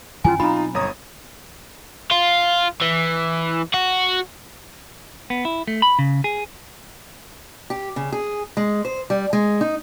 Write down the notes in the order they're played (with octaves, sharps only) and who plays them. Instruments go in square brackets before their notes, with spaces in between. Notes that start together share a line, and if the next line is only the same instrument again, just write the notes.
[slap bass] F#2 D#3 E3 [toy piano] C#4 E4 G#5 [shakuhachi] F4
[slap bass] B2 F#3 C4 [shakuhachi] D#4 [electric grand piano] F4 F5 [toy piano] A#5 B5
[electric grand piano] G1 A#5 D#6 [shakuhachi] C#5
[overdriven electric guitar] F4
E3
F#4
[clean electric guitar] B3
E4
A3
B5
C#3
G#4
[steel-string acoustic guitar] G4
C#3
G#4
G#3
C5
G3
G#3
D#4